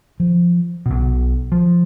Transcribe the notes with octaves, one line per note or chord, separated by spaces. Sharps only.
F3
B1 B2
F3